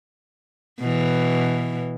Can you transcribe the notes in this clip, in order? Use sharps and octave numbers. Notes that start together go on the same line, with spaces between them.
B2 E3